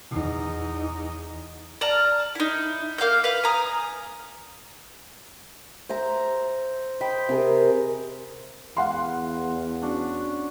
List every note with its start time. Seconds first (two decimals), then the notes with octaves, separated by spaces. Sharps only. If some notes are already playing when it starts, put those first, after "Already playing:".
0.11 E2 D#4
1.81 D5 A5 A#5 F6
2.35 D#4 E4
2.98 A#3 F5 F6 G6
3.24 B4 F5
3.44 G#5 A#5 D#6
5.89 C5 E5 A#5
7.01 C5 D#5 G5 B5
7.29 C3 G#4 A#4
8.77 E2 F5 F#5 C6
9.82 C#4 D4 F#4